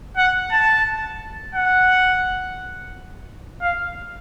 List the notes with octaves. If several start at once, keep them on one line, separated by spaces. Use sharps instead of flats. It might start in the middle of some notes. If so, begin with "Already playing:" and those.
F#5
A5
F#5
F5